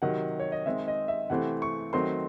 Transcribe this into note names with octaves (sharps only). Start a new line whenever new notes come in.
C3 D#3 F#3 F#5
C#5
D#5
D#3 G#3 C4 E5
D#5
E5
C3 E3 A3 C4 F#5
C#6
D#3 F#3 A3 C4 C6